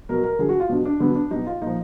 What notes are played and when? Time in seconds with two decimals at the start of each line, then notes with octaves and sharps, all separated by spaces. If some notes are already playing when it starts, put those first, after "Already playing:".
0.09 B2 F#3 A#4
0.24 A#4
0.39 D3 F#3 G#4
0.49 F#4
0.60 F4
0.69 B2 F#3 D4
0.85 D4
1.00 D3 F#3 B3
1.15 D4
1.30 B2 F#3 D#4
1.46 F4
1.61 A#2 F3 D#4